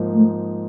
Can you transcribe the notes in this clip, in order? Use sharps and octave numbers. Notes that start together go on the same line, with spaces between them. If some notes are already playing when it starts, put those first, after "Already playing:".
Already playing: G#2 F3 A#3 D#4
A3